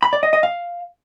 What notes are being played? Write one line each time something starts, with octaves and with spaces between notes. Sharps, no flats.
B5
D5
D#5
D#5
F5